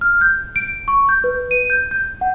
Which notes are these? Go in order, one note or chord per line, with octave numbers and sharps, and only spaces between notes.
F6
G6
D7
C#6
G6
B4
D#7
G6
G6
F#5